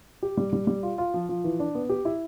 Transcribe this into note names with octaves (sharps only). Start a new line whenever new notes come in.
G4
G3
G3
G3
F4
F4
F3
F3
E3
D4
B3
G4
E4